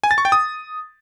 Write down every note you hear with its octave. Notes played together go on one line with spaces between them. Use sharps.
G#5
A6
C#6
G5
D#6